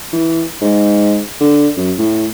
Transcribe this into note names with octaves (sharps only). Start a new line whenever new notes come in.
E3
G#2
D3
F#2
A2